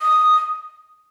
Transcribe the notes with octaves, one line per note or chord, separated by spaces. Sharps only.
D#6